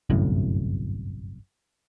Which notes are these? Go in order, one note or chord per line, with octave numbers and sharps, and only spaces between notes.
G1 C2 F#2 A2